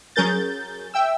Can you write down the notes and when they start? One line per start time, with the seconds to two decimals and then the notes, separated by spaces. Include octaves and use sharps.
0.16 F#3 C#4 G#4 A#4 G6 A6
0.94 E5 G5 E6